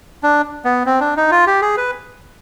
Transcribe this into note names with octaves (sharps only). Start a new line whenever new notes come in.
D4
B3
C4
D4
D#4
F4
G4
G#4
B4